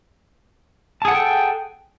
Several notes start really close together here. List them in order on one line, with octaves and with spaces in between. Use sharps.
A5 G#4 F#5 A4 G5